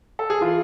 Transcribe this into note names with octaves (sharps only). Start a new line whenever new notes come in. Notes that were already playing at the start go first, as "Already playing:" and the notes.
A4
G#4
E3 F4